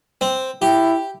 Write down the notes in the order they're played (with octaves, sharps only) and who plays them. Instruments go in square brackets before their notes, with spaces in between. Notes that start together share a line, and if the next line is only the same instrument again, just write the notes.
[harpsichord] C4
[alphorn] E4 [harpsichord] G4